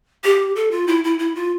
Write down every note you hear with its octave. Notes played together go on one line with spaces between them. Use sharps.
G4
A4
F4
E4
E4
E4
F4